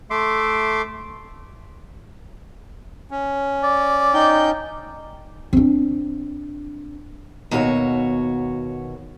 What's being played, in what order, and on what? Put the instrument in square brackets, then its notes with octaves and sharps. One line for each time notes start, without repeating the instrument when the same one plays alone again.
[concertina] A3 E5 C6 D6
[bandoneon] C#4
[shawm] D5
[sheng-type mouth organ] D#4 G5 G6
[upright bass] C4 D4
[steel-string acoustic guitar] D#2 B2 F#4 C#5